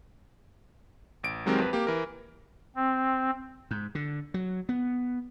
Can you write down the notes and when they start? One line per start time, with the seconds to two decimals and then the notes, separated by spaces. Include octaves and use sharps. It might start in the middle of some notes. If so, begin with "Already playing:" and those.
1.23 A1 D7
1.46 D#3 F#3 G#3 C4 G4 A#4
1.58 F2 B4
1.73 A#3 G4
1.87 E3 A#4
2.76 C4
3.71 G#2
3.95 D3
4.34 F#3
4.69 B3